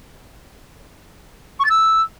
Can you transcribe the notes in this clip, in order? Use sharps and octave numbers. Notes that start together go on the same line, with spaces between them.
C#6
A6
E6